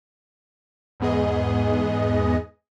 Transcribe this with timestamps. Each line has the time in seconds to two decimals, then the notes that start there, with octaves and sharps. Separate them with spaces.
1.00 E2 G#2 B3 G#4 D#5